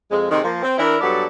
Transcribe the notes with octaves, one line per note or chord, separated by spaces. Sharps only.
F2 G#3
C3 D#3 G#3
F3 A#3
C4
E3 D4 E4 A#4
G2 F#3 B3 A4 D5